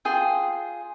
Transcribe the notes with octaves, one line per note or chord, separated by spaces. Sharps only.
F4 G#4 G5